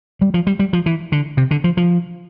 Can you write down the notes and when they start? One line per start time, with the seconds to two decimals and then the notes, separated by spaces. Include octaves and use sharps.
0.21 G3
0.34 F3
0.47 G3
0.59 G3
0.73 F3
0.86 E3
1.12 D3
1.37 C3
1.51 D3
1.64 F3
1.77 F3